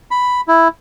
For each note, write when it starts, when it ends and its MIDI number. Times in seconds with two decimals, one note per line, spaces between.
0.11 0.41 83
0.48 0.68 64